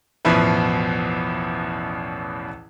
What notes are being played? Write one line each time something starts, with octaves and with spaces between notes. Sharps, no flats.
A1 E2 B2 F3 E4 B4